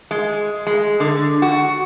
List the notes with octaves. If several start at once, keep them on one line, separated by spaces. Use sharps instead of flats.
G#3
G#3
D3
F#4